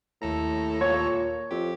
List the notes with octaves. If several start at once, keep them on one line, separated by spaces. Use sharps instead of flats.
D#2 A2 A4 A#5
A#2 C#5
F2 G4